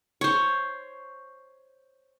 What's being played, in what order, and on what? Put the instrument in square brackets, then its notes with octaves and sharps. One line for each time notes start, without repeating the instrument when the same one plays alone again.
[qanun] C5 C#5